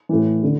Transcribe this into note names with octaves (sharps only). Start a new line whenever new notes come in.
A2 E3
D3